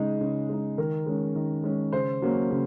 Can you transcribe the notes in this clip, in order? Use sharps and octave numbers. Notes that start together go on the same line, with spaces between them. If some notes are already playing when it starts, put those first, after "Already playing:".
Already playing: C#3 G#3 D#4 G#4
C#3
G#3 D#4
D#3 A#4
G#3 C#4
D#3
G#3 C#4
C#3 C5
F#3 A#3 C#4
C#3